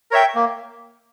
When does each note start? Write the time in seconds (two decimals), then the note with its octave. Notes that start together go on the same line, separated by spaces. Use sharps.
0.11 A#4 C#5 E5 G5
0.35 A#3